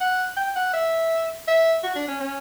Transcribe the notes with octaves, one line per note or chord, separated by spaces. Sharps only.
F#5
G5
F#5
E5
E5
F#4
D4
C#4
C#4